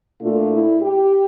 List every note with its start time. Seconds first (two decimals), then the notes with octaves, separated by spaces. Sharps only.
0.21 A#2 A3 D4 F4
0.52 E4
0.82 G4